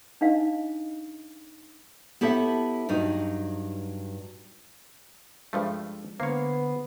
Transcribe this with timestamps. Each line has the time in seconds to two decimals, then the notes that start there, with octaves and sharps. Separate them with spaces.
0.21 D4 D#4 D#5 F5
2.21 B3 E4 G4 A4 C#5 E5
2.89 G2 F#3 D#4
5.53 G2 F3 G#3 A3
6.20 D3 A#3 B3 C5 C#5 C7